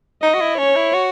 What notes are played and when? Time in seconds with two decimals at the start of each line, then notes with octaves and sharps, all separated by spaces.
0.22 D#4 D#5
0.34 F#4
0.41 E4
0.58 C#4 C#5
0.76 E4
0.94 F#4